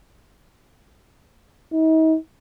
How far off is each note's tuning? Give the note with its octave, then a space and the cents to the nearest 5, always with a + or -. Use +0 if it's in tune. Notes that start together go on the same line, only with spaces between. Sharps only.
D#4 +40